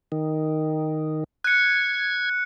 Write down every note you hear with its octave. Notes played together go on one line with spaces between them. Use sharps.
D#3
F#6 G#6 C#7